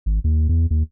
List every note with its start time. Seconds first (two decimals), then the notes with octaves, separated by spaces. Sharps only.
0.06 G#1
0.24 D#2
0.49 E2
0.71 D#2